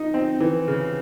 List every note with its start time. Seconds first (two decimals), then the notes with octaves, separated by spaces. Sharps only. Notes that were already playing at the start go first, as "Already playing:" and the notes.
Already playing: D#4
0.14 C4
0.41 E3
0.68 C#3